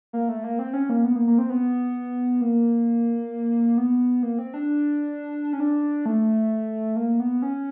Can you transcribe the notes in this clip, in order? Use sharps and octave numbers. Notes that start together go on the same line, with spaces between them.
A#3
A3
A#3
C4
C#4
A#3
B3
A#3
A#3
C4
B3
A#3
B3
A#3
C4
D4
C#4
D4
A3
A#3
B3
C#4